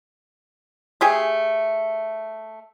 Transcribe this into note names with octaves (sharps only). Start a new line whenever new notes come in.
A3 G4 G#4